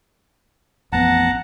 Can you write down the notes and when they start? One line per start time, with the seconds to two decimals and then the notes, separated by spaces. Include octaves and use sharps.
0.93 A1 F2 B3 F#5 A5 A#5